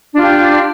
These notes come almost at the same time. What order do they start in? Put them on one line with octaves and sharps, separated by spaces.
D4 F4 G4